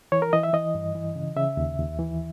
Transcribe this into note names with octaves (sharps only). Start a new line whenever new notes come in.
E3 C#5
A#4
E3 D#5
E5
E3 D#5
G2
E3
C#3
C#3 E5
D#2
D#2
E3